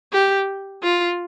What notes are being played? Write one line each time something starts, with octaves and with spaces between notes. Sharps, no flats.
G4
F4